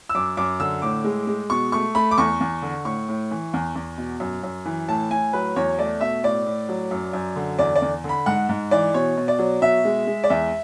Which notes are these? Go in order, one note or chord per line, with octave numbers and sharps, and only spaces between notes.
E6
F#2 D6
F#2 D6
D3 E6
A2 D6
G#3
G#3
B2 C#6
A3 C#6
A3 B5
D6
E2 C#6
E2
D3
A2 C#6
A2
E3
E2
E2
B2
F#2
F#2
E3
A2 A5
A2 G#5
F#3 B4
E2 C#5
A3 D5
B2 E5
A2 D5
A2
F#3
F#2
F#2
D3
E2 D5
D5
E2
D3
B5
G#2 F#5
G#2
E3 D5
B2 C#5
B2
D5
F#3
B2 E5
G#3
G#3
D5
E2 E5